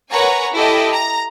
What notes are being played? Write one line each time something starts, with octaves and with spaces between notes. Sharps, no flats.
A#4 B4 C#5 F#5 G#5 A#5
E4 G4 A4 D#5
A#5